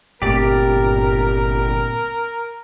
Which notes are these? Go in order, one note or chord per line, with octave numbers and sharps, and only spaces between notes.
G1 A#2 A3 C4 G4 A#4 D5